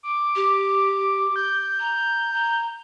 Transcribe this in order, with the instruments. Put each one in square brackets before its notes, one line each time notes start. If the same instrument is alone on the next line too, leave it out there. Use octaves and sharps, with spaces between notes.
[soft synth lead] D6
[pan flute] G4
[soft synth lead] G6
[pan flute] A#5
A#5